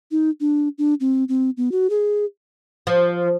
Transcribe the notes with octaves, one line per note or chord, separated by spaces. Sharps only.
D#4
D4
D4
C4
C4
B3
F#4
G#4
F3